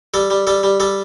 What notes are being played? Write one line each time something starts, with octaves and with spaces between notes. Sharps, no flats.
G3 A4
G3
G3 A4
G3
G3 A4